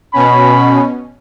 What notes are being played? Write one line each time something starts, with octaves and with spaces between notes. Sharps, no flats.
B2 C#4 B5